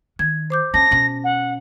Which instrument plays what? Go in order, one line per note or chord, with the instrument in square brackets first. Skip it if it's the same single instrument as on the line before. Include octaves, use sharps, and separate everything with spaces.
[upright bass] D#3 [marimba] G#6
[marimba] C5 D6 G6
[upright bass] C#4 [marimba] A5 [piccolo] A#6
[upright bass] B2 C#4
[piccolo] F#5